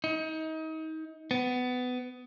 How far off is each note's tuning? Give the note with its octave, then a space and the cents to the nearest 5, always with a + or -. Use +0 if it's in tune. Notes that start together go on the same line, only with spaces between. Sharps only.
D#4 +30
B3 +20